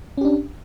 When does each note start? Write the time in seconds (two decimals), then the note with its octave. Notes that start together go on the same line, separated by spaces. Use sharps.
0.17 C#4
0.21 G4
0.25 D4